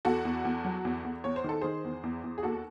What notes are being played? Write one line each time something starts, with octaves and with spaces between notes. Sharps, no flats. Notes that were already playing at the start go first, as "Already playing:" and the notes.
E2 F#4 A4
E2
E2
F#3
E2
E2
E2 C#5
C5
D#3 A4
D#3 G#4 C5
E2
E2
E2
G#4
D#2 F#4 A4